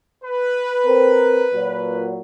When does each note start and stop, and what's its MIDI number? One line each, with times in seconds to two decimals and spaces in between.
0.24 2.10 71
0.85 1.44 60
0.85 1.44 70
1.53 2.21 46
1.53 2.21 54